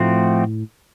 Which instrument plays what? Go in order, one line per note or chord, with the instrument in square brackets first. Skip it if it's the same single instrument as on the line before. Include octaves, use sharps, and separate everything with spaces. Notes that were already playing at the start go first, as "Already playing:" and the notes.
Already playing: [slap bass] A2 [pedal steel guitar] F3 A3 C4 F#4